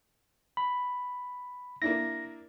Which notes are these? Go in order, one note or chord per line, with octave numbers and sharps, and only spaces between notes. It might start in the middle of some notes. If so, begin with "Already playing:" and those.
B5
A#3 D4 E4 A#6